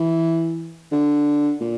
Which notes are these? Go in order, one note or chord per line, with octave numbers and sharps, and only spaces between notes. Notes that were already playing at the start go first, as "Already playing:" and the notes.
Already playing: E3
D3
A#2